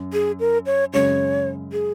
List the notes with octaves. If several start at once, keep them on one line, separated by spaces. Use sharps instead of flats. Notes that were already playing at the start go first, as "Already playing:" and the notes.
Already playing: F#2
G#4
A#4
C#5
F#2 C#3 G#3 C#5
G#4